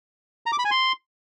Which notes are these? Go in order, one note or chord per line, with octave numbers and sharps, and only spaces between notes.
A#5
D6
B5
G#5
C6